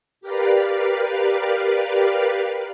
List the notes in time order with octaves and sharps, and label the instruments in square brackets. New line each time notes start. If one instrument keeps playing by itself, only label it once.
[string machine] G4 A#4 B4 D5 F5